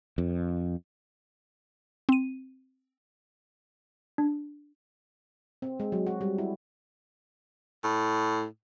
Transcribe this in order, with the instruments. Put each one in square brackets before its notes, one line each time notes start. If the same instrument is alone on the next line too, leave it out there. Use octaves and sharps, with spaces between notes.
[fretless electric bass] F2
[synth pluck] C4 D#7
[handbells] D4
[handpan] C4
G#3
F#3
F#4
G3
E4
[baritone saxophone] A2